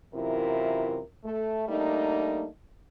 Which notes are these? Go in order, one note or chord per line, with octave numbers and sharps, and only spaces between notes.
F#2 C3 E3 E4 F4 A#4
A3
G3 A3 A#3 D4 D#4